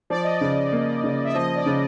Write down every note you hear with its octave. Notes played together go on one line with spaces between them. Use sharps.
F3 D5
D#5
C#3 D5
A#3
C#3
E5
F3 D#5
D5
C#3